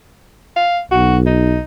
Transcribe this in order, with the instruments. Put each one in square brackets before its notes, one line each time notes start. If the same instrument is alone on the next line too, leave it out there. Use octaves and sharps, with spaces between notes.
[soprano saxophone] F5
[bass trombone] B1 [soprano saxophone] F#4
[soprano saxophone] D#4